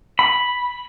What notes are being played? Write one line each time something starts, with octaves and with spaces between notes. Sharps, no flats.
B5